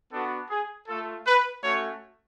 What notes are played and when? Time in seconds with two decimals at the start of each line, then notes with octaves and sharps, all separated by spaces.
0.12 B3 D4 F#4 A4
0.50 G#4
0.88 A3 F4 A4
1.26 B4
1.63 A3 C#4 F#4 C#5